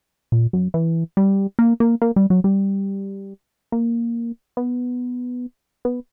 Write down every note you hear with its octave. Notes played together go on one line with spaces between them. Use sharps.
A#2
F#2
E3
G3
A#3
A#3
A#3
G3
F#3
G3
A#3
B3
B3